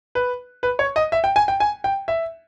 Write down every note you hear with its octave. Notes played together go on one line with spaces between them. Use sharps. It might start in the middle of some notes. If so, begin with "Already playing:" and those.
B4
B4
C#5
D#5
E5
G5
G#5
G5
G#5
G5
E5